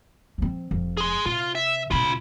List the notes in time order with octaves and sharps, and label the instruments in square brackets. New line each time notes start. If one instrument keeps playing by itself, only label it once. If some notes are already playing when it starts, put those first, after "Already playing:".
[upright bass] F3 C4
F1 F2
[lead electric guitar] G#4 C6
[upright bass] C3 [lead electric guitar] F4
[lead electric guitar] E5
[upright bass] C#2 B2 [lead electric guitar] F4 B5